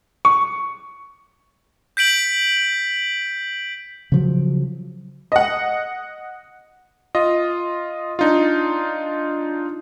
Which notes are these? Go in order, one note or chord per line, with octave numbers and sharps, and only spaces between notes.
C#6
G6 B6 D7 F#7
C#3 F3 F#3
D#5 F#5
F4 D#5
D4 D#4 F4